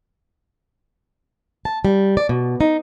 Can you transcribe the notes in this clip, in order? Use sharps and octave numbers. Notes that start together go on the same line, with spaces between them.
A5
G3
D5
B2
D#4